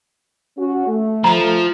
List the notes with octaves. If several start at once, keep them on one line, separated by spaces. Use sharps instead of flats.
C#4 F#4
A3
F3 A#5